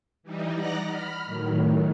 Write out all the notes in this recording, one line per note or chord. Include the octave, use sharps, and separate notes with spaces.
E3 G3 D#4
D5 D#5 F#5 A#5 F#6 A#6
B5 F6
A2 D#3 F#3